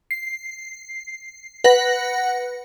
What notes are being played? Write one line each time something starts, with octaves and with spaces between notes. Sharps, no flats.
C7
B4 F#5 A#6